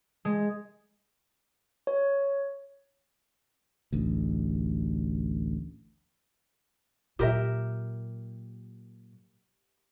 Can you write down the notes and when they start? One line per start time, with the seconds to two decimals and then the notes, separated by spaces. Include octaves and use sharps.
0.25 G#3
1.87 C#5
3.92 A1 D2
7.19 A#2 F#3 G4 A#4 E5